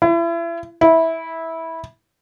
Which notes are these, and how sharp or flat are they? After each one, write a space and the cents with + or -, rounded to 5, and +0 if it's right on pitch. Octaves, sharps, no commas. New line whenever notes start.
E4 +35
E4 -15